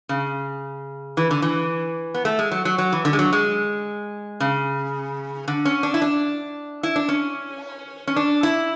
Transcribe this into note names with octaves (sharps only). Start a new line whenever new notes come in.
C#3
E3
D3
E3
B3
A3
G#3
F#3
F#3
F#3
E3
D3
G#3
F#3
G#3
C#3
D3
C#4
D4
E4
D4
E4
D4
C#4
C#4
D4
E4